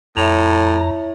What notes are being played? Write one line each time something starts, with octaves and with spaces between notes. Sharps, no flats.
F2 A2 E4 C#5 E5 A#5